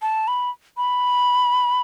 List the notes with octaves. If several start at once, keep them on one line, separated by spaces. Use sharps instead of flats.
A5
B5
B5